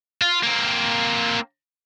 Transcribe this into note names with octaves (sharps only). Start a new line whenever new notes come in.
F4
A#3 C4